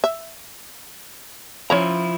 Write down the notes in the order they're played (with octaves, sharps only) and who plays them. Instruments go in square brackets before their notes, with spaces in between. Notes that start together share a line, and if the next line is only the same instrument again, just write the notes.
[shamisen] E5
[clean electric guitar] F3 E4 [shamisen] C#4 C#5 A#5